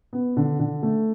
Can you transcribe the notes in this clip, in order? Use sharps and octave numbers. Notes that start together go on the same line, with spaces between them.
B3
D3
D3
A3